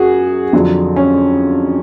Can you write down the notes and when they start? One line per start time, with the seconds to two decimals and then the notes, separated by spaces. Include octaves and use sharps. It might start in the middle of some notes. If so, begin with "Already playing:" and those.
Already playing: F#2 F#3 F#4 G#4
0.53 F2 D3 F#3
0.96 C#4